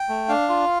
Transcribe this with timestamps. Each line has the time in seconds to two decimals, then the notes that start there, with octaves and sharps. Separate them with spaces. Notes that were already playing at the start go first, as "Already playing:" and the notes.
Already playing: G5
0.09 A3
0.29 D4 F5
0.49 F4